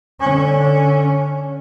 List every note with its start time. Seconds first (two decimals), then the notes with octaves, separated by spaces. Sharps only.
0.20 D3 C#4